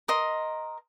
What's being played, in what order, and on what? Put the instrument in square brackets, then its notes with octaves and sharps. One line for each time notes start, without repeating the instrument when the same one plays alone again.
[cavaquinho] A#4 D#5 C6